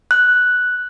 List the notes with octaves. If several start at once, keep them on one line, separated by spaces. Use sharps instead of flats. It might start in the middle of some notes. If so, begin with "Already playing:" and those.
F#6